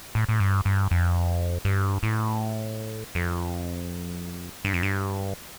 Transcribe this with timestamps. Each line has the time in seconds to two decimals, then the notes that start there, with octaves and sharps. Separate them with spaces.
0.15 A2
0.29 A2
0.40 G2
0.65 G2
0.91 F2
1.65 G2
2.03 A2
3.15 F2
4.65 G2
4.73 F2
4.83 G2